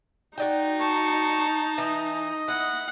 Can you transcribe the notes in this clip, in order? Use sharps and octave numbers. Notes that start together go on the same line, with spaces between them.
D#4 F#4 D5 G5
A5 C#6
E3 D#5
E4 F#5